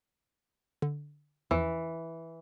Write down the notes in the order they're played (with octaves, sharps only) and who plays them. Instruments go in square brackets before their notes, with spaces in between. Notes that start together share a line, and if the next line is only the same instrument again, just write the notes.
[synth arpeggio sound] D3
[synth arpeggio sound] E2 F3 E6 [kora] E3